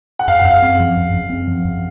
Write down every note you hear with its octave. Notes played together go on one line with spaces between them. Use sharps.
F#5
F#2 F5
F#5
F#2
F5
C4
F3
F#2
F#2
C4
F3
F#2